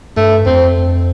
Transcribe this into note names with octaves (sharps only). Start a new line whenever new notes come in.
G2 A3
F2 C4